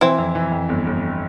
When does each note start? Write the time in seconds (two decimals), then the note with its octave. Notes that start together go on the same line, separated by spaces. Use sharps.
0.01 E3 C4 E4
0.18 F2
0.35 E3
0.52 F2
0.69 G1
0.87 G1